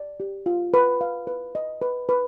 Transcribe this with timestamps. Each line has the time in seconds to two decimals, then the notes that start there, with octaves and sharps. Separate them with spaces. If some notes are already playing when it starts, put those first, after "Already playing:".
Already playing: D5
0.20 G4
0.46 F4
0.74 B4
1.01 F5
1.27 B4
1.55 D#5
1.82 B4
2.09 B4